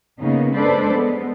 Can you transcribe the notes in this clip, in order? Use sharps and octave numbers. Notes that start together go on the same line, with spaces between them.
C#3 A#3 B3 D#4
G#3 D4 A4 B4 C5 D5
G#3 B3